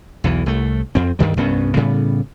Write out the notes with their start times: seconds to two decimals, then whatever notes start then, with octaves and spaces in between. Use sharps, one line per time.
0.24 B1 E2 E3
0.46 C2 A3
0.95 F2 C4
1.19 D2 G2 D#3 G3
1.37 C2 G2 B3 C#4
1.76 A2 C#3 G3 B3